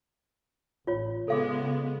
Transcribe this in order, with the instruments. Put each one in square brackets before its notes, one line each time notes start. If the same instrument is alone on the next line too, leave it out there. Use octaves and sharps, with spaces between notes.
[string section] A1 [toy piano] F4 C#5
[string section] C#3 G#3 B3 [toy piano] A4 F5 D6